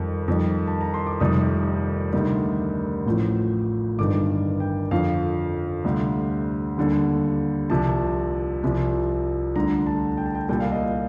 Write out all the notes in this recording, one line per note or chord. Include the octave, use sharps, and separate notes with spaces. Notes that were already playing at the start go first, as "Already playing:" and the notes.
Already playing: F2 D#3 G3
F2 D#3 G3
A5
A#5
C6
D6
F1 F2 C3 D#3 G3 D#6
D2 C3 D#3 G3
A1 A2 F3
G1 G2 D#3 G3 D6
G5
F2 D3 F3 F5
D2 C3 G3
D#2 D3 G3
C2 C3 F3 A5
C2 C3 F3
D2 D3 G3 A#5
A5
G5
A5
G5
C2 A#2 G3 G5
F5
D#5
F5